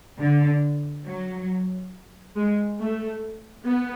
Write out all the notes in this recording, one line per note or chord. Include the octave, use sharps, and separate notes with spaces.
D3
F#3
G#3
A3
B3